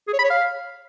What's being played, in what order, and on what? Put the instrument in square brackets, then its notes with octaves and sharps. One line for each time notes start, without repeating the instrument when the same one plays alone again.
[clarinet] G#4
C#5
B5
C#5
F5